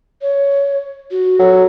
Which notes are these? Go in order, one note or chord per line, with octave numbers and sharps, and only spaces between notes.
C#5
F#4
F#3 A4